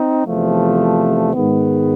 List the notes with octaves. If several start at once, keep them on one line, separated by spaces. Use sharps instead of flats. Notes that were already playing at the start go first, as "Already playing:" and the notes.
Already playing: C4 D#4
E2 C3 F3 A3
G#2 D#3 G#3 B3